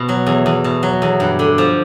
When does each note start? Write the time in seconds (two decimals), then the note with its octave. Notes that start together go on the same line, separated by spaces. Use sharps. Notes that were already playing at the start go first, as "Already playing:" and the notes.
Already playing: B2
0.09 F#3
0.27 E2
0.46 E2
0.64 B2
0.83 F#3
1.02 E2
1.20 G2
1.39 D3
1.58 F3